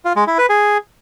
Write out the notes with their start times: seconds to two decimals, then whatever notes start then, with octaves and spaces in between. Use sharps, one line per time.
0.05 F4
0.16 G#3
0.27 E4
0.38 B4
0.49 G#4